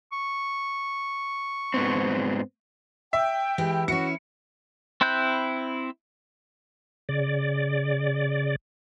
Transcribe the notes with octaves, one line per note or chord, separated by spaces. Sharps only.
C#6
G#2 B3 C4
E5 G5
E3 G#3 G4
C#4 E4 F#4 C#7
C4 E4 B5 F#6 G6
C#3 D5